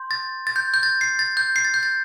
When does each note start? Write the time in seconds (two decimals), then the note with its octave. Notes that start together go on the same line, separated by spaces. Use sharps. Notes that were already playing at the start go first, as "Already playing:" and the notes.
Already playing: C6 G6
0.11 A6
0.47 A6
0.56 G6
0.74 G6
0.83 A6
1.01 C7
1.19 A6
1.37 G6
1.56 C7
1.65 A6
1.74 G6
1.83 A6